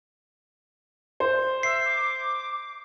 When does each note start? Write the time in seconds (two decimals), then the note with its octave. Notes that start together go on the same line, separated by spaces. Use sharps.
1.20 C5
1.63 E5 C7
1.85 D6